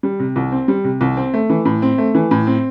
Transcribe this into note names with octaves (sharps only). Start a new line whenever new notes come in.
G3
C3
C2
C4
G3
C3
C2
C4
A3
E3
A2
C4
A3
E3
A2
C4